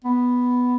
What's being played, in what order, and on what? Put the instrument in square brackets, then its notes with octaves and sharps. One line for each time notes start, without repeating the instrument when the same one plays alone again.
[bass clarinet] B3